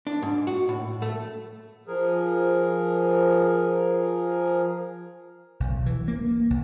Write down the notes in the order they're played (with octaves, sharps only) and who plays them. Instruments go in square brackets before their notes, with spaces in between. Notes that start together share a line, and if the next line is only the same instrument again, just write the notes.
[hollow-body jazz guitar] D4
G#2
F#4
A2
A3
[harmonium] F3 G#4 A#4
[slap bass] B1
E3
A#3
C2